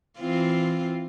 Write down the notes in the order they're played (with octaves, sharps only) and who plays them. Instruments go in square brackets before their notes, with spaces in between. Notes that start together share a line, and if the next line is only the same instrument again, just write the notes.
[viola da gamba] E3 C4 F4